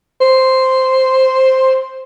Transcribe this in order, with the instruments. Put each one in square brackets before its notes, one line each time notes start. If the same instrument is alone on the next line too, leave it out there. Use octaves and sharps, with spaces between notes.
[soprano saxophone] C5